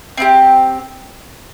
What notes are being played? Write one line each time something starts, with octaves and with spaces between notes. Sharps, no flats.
C4 E4 G4